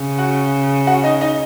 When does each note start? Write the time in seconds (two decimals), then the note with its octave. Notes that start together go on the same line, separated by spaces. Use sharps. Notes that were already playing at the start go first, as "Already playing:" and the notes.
Already playing: C#3
0.19 F#4 F#5
0.87 F#4 F#5
1.04 D#4 D#5
1.21 D#4 D#5